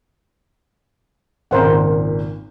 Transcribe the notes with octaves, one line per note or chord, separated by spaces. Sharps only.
G#1 C#2 A#2 A#4 C5 F#5